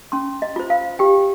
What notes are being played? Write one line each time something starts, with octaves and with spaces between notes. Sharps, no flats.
C#4 C6
D#5
F4 C5
F5
G4 G5